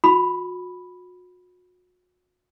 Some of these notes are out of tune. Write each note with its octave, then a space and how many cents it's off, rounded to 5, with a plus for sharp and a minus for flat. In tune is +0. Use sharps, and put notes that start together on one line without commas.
F#4 -40 B5 +0